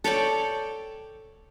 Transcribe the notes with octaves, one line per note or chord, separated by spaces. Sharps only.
A4 C#5 D5 G5